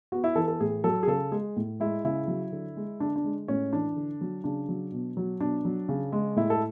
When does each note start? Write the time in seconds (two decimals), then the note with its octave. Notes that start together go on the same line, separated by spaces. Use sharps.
0.12 B3 F#4
0.24 E4
0.36 E3 A4
0.48 A4
0.60 A2 G#4
0.84 F#3 A4
1.03 G#4
1.07 C#3 A4
1.32 G#3 G#4
1.56 A2
1.80 G#3 E4
2.05 C#3 E4
2.28 F#3
2.52 D3
2.77 G#3
3.00 D3 D4
3.16 D4
3.24 G#3
3.48 A2 C#4
3.73 E3 D4
3.96 D3
4.21 F#3
4.44 C#3 D4
4.69 F#3
4.92 B2
5.17 F#3
5.40 B2 D4
5.65 F#3
5.89 C#3
6.12 G#3
6.36 A2 E4
6.50 A4